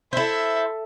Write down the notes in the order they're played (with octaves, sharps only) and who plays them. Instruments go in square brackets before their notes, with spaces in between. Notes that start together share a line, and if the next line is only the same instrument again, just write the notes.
[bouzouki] E4 C5 [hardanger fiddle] A4 E5